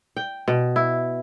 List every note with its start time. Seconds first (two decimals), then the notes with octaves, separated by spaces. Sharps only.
0.17 G5
0.48 B2
0.76 E4